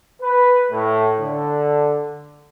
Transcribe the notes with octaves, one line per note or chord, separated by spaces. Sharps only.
B4
A2
D3